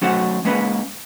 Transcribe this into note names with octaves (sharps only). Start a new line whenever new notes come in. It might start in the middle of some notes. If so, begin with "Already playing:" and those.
F#3 A3 C#4 F#4 C5 F#5
G#3 A#3 C#4 B4